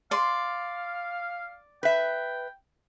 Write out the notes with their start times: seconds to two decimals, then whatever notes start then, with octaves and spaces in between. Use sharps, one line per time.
0.11 D5 F5 C6
1.83 B4 E5 G5